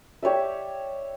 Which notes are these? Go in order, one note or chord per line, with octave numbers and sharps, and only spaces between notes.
G4 C#5 D5 E5